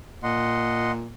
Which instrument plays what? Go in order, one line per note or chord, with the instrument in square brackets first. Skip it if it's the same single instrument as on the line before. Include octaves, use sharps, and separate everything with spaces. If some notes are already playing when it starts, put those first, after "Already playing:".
[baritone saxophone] A#2 [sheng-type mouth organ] D#5 F#5 C6